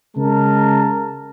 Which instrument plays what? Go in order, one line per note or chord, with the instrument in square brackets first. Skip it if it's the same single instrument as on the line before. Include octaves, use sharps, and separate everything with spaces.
[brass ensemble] C#3 G#3 A#4 A5